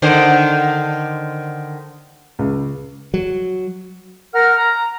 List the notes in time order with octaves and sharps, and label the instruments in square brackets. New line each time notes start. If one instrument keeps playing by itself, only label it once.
[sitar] D3 D#3 C5
[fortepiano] C#2
[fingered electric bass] F#3
[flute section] A#4 F#5 F6
A#5